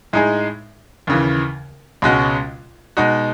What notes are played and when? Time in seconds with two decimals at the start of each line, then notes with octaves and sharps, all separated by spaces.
0.13 A2 G#3 D#4 G#4
1.07 D#2 C#3 E3
2.02 C#2 B2 G#3 C#4 F#4
2.97 B2 G#3 D#4 F#4